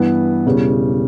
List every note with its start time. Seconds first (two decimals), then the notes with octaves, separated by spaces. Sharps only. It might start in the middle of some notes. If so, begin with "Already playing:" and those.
Already playing: G2 E3 B3
0.45 E1 E2 C#3 G3